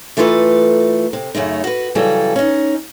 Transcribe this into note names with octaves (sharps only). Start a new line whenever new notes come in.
E3 A3 F4 A4 B4 A#5
C3
F#2 C#3 A3 D#4
F#4 B4
C#3 E3 F#3 G3 A4
C#4 D#4